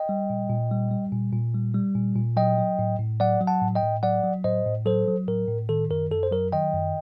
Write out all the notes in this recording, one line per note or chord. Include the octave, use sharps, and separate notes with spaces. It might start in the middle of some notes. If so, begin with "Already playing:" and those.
Already playing: D#5 G5
G3
A#2
A#2
G3
G3
A#2
A#2
G3
G3
A#2
A#2
F#3 D#5 G5
F#3
A2
A2
F#3 D5 F#5
F#3
F#5 A5
A2
D#5 G5
A2
F#3 D5 F#5
F#3
A2 C5 D#5
A2
F#3 A4 C5
F#3
A2 A#4
A2
D#3 A4
F#2 A#4
F#2 A4
C5
F#3 A#4
D#3 D#5 G5
F#2